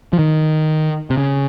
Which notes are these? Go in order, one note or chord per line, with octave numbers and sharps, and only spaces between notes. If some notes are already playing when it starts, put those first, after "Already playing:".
F3
D#3
C3
C#3